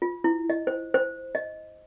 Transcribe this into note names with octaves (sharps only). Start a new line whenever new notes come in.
F4
E4
D#5
C5
C5
D#5